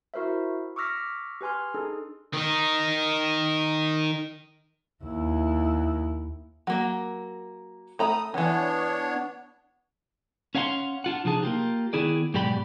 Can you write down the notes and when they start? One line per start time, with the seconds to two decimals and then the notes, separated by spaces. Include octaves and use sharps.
0.14 E4 F#4 A#4 C5 E5
0.76 C#6 D6 E6 F6 A#6 B6
1.41 G4 B4 G#5 C6 F6
1.74 D4 D#4 G#4 A4
2.33 D#3 D#4
5.04 D#2 E4
6.67 F#3 A#3
7.99 A3 A#5 B5 D#6
8.34 D#3 E3 B3 D4 C#5
10.55 C#4 C#5 F5 F#5 G#5 C6
11.04 D4 F4 F#5
11.25 C3 F3 D4 D#4 G#4 A5
11.43 A#3 F4 G4
11.93 D#3 B3 E4 G#4 D5
12.34 G#2 B2 F#3 G4 D5 B5